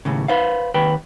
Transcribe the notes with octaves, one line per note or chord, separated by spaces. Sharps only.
D#2 A2 C#3
B4 C5 F5
D#2 B4 G5